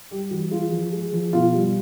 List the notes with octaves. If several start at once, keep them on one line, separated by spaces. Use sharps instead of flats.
G3 G4
E3 F#4
G#3 F4
F3
G#3
F3
B2 F4
G3